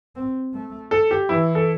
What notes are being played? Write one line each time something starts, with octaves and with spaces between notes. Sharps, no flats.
C4
A3
A4
G4
E3 E4
A4